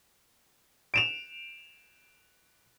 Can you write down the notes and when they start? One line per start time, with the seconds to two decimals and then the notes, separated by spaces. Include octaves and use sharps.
0.94 D7 E7 F7